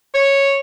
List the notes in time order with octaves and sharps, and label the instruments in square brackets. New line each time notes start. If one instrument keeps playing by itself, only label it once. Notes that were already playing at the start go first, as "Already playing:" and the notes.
[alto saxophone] C#5